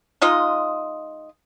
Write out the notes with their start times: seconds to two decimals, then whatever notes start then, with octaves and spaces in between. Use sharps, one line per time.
0.22 G#3 D#4 F4 D#5